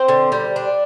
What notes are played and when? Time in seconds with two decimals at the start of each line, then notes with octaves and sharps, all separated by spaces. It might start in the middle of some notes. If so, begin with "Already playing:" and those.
Already playing: C4 C5
0.08 D3
0.32 G3
0.56 D4